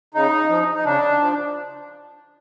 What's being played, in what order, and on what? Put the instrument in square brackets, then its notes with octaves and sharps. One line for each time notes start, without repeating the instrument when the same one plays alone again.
[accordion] C#3 D#4
F3
D#4
C#3 D4
F3